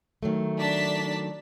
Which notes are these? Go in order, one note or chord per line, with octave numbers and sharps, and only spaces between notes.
D#3 F#3 A3
D4 A5 B6